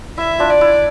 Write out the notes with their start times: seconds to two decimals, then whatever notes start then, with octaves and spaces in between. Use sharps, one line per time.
0.18 E4 E5
0.39 D4 F4
0.50 D5
0.61 E4